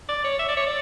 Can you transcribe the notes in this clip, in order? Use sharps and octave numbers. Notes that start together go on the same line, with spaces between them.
D5
C#5
E5
D5
C#5
D5